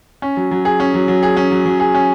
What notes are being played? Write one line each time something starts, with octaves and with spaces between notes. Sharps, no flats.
C#4
F#3
F#3
G#4
C#4
F#3
F#3
G#4
C#4
F#3
F#3
G#4
C#4